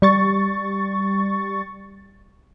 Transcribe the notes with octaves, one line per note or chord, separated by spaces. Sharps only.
G3 C#6 A6